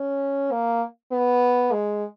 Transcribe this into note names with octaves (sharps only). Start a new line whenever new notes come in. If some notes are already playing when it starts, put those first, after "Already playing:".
Already playing: C#4
A#3
B3
G#3